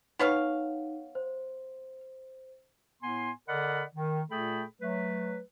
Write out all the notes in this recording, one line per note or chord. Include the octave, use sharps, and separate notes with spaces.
B3 D#4 C#5 F5
C5
A2 B3 G#5 C6
D3 A#4 D5 D#5 F#5 B5
D#3
A#2 A3 G#4 A4 G5 B5
F#3 A3 B4